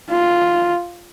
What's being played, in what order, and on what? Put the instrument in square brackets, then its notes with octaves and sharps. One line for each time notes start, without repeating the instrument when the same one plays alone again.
[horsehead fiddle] F4